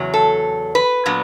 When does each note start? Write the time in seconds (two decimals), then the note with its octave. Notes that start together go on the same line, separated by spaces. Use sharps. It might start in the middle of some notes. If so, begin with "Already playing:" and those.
Already playing: E2 C#3 F#3
0.14 A4
0.75 B4
1.06 A#2 F#3 B3 D4